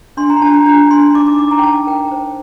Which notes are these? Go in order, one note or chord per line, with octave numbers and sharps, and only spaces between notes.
D4 C6
A#5
D4 A5
A#5
D4 A#5
D4 C6
D#4 D6
D6
D#4 D6
A#5
G5
D#4 A5
A#4 G5
C5